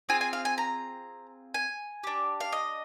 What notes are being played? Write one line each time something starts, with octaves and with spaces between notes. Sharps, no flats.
C4 F4 G#4 G#5
G#5
F5
G#5
A#5
G#5
D4 G4
F5
D#5